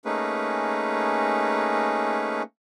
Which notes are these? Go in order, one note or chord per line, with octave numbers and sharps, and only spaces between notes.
A3 A#3 C#4 D#4 G#4 B4